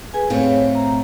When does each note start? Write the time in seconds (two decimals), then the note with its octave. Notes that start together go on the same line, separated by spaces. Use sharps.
0.14 G#4 B4 G#5
0.30 A2 A3 C4 C#5 F5
0.75 A#5